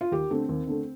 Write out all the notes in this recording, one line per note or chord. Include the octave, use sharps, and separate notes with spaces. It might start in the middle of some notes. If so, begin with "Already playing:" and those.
F4
D#2 G4
D3 A3 C4
D#2
D3 A3